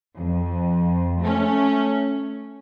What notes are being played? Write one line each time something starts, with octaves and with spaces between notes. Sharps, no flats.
F2
A3 C#4